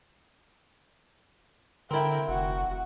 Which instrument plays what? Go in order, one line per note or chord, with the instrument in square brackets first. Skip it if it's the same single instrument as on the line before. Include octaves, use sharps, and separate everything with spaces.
[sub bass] D3 [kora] C4 E4 [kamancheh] A#4 G5
[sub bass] F1 [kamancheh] F#4